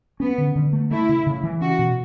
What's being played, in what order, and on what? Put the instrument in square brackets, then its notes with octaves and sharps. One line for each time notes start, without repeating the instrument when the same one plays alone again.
[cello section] B3 [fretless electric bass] C#4
[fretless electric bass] D3
D3
A3
[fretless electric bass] A3 [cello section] E4
[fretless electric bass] C#3
C#3
E3
[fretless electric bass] C#4 [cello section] F#4
[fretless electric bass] B2